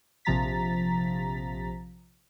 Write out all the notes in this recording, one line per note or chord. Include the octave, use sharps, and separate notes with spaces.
A#1 C3 F3 A#5 A6 B6